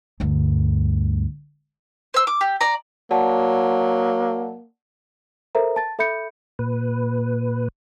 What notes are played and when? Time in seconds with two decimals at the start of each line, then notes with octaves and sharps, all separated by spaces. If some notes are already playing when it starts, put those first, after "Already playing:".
0.20 D2 G2
2.14 C5 E6
2.27 D6
2.41 G4
2.61 D5 A#5
3.11 F#3 A#3 D5 F#5 A5
5.55 A4 A#4 C5 E5 A#5
5.76 A5 A6
5.99 A4 E5 B5 G6 C#7
6.59 A#2 B4